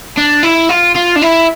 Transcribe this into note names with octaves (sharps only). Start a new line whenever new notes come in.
D4
E4
F4
F4
D4
E4